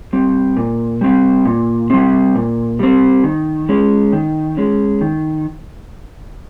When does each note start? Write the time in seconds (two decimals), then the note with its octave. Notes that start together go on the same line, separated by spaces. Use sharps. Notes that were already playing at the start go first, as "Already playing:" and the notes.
0.13 G3 C4
0.57 A#2
1.01 G3 C4
1.45 A#2
1.90 G3 C4
2.35 A#2
2.79 G3 C4
3.24 D#3
3.69 G#3 C#4
4.13 D#3
4.57 G#3 C#4
5.01 D#3